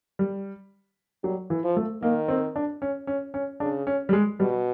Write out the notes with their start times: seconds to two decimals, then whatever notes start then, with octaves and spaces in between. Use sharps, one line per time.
0.19 G3
1.24 F#3 G3
1.50 E3
1.64 F3
1.77 A3
2.02 D#3 A#3
2.28 C4
2.56 D4
2.82 C#4
3.07 C#4
3.34 C#4
3.60 C#3 D4
3.87 C#4
4.09 G3
4.13 G#3
4.40 B2 G3